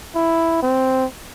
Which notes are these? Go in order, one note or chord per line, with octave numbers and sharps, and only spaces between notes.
E4
C4